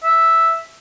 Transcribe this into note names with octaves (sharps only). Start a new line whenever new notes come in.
E5